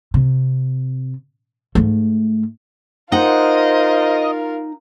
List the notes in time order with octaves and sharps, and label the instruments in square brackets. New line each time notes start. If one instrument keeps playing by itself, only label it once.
[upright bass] C3
G#2 A3
[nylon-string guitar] D#4 F#5 [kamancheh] F4 A#4 [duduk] C5 [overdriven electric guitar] D#5